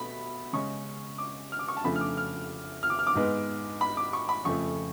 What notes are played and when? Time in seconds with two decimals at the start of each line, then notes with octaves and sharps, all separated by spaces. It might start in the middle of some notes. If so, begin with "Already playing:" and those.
Already playing: B2 A3 B5
0.53 C#3 G#3 C#4 C#6
1.18 D6
1.52 F6
1.59 D6
1.68 C#6
1.77 A5
1.84 F2 C#3 F3 A3 D4 B5
1.96 F6
2.01 D6
2.17 F6
2.83 F6
2.90 D6
2.99 F6
3.07 D6
3.15 G#2 G#3 B3
3.81 B5
3.97 D6
4.13 C#6
4.29 B5
4.45 F2 C#3 F3 A3 C#6